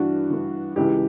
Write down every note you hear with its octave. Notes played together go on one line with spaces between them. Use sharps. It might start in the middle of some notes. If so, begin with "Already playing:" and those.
Already playing: G2 E3 D4 F#4
G2 E3
C#2 C#3 E3 E4 G4